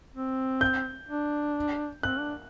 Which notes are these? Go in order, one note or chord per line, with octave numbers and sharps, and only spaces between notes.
C4
G6
D4
C4 F#6
D4